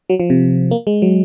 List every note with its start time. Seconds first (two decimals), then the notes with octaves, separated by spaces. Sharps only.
0.10 F#3
0.20 F3
0.30 C3
0.71 A#3
0.87 G#3
1.02 F#3